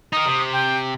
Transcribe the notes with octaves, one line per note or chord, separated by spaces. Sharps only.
D#4 A#4 D#6
C3
G5